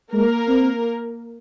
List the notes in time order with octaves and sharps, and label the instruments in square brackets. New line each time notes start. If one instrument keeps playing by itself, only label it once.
[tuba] G#3 [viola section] A#3 A#4
[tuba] C4